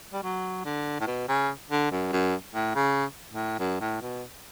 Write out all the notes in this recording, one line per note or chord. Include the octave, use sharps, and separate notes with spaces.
G3
F#3
D3
A2
B2
C#3
D3
F#2
F#2
A2
C#3
A2
F#2
A2
B2